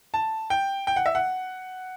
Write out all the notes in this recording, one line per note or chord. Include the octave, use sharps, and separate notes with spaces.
A5
G5
G5
F#5
E5
F#5